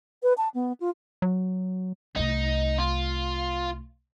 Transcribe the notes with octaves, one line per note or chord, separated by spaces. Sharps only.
B4
A5
B3
F4
F#3
C2 A3 D#4
F4